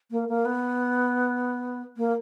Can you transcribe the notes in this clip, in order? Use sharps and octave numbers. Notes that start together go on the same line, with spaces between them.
A#3
A#3
B3
A#3